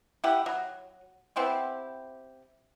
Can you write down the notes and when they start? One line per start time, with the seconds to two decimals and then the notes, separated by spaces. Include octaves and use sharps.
0.24 E4 G4 F#5
0.46 F#3
1.36 B3 C4 E4 G4